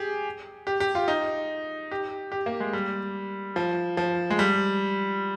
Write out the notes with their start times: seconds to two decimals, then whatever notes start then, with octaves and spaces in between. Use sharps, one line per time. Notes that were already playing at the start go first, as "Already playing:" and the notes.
Already playing: G4 G#4
0.67 G4
0.80 G4
0.95 F4
1.08 D#4
1.91 G4
2.32 G4
2.46 A#3
2.60 G#3
2.73 G3
3.56 F3
3.97 F3
4.30 G#3
4.39 G3